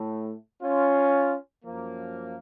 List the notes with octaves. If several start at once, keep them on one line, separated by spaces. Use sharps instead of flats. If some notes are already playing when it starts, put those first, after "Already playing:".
Already playing: A2 A3
C#4 F4
F#2 F3 A#3